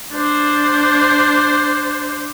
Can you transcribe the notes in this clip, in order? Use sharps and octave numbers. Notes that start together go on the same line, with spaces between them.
D4 C5